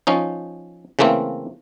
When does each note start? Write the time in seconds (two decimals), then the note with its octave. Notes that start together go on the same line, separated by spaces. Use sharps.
0.07 F3 C#4 D#4
0.99 C#3 E3 A3 A#3 C4